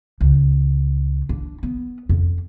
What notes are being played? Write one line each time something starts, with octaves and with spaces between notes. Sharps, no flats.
C#2
D4
B3
F2